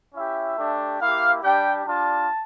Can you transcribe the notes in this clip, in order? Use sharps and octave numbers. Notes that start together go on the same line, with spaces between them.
C#4 E4 G4 E5
A3 D4 G4
A#3 E4 G4 F5
G3 D4 G4 G5
G3 D4 F4 A5